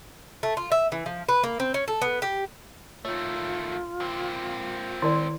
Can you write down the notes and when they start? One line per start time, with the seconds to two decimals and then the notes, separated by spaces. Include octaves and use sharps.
0.43 A3
0.57 F4
0.72 E5
0.92 E3
1.06 F3
1.29 B4
1.43 A#3
1.60 C4
1.74 C#4
1.88 A4
2.02 B3
2.22 G4
3.05 D#3 A3 F4 C#5
4.00 A#3 C4
5.02 D#3 E4 A#4 D5 C6